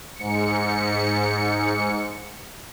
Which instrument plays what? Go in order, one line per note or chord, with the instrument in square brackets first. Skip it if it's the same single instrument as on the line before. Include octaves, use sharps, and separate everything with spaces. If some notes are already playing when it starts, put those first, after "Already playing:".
[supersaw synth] G#2 C#7